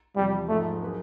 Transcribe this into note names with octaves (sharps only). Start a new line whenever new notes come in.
E2 C3 F3 G3
G#2 F3 G#3 A3
F#3 A#3 D#4 G#4 B4